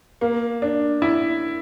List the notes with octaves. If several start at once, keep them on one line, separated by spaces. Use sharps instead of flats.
A#3
D4
E4